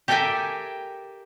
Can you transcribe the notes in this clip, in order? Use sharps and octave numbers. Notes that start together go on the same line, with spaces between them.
G4 A4 A#4 E5 G5 G#5